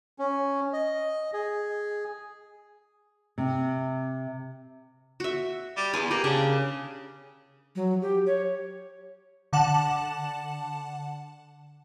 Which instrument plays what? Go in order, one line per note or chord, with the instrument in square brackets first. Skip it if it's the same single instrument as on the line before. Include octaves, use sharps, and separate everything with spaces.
[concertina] C#4
D#5
G#4
[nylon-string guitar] C3
[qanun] F#4 E5
[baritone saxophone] G3
[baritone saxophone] E2 [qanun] G#5 D6
[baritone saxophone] A#3 [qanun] G4
[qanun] C#3 [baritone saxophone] D4
[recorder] F#3
G4
C#5
[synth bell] D3 F#5 A5 E7 F#7